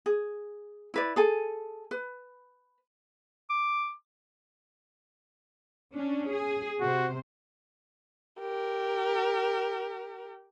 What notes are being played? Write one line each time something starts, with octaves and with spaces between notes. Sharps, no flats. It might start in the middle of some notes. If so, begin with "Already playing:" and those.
G#4
E4 B4 D5
G#4 A4 G#5
B4
D6
C#4 D4
G#4
C3 F#4 C5
G4 A#4